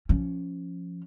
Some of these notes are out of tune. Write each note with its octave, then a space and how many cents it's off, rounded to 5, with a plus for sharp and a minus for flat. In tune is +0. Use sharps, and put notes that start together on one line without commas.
F3 +0 C#4 +0